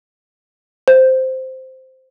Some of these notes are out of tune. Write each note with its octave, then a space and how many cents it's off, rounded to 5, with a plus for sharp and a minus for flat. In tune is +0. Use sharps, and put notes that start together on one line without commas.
C5 -5